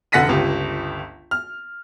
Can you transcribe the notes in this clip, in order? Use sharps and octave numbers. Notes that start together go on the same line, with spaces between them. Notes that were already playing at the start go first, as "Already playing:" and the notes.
F1 D3 F#5 A#6 B6 D#7
G1 C#2 G4
F6